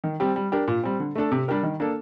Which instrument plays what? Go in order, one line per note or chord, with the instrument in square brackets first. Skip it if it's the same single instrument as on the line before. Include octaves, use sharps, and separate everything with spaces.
[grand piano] D#3
G3 C4 G4
G3
D4 G4 A#4
A#2
G3 C4
D3
A3 D4 A4
C3
G3 D4 G4 A#4
D#3
A#3 D4 A4